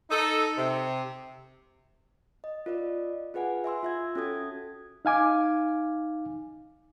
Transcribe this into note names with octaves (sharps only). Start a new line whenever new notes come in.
D#4 A4
C3
D#5
F4 A#4 D5 D#5
F4 G#4 B4 F#5 G#5
E5 G#5 C6 E6
F4 E5 G#6
C#4 F#4 A4 D#6 G#6
D#4 F5 G#5 D6